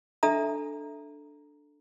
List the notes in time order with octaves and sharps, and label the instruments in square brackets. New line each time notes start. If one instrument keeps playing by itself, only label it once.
[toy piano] D4 A4 E5 A#5 D#6